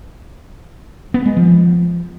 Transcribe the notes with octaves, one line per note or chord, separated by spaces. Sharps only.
B3
G#3
F3